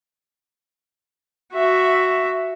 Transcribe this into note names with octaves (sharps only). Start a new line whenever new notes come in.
F#4 E5